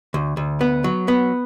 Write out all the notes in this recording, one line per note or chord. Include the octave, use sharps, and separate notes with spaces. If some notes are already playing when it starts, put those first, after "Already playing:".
D2
D2
B3
F#3
B3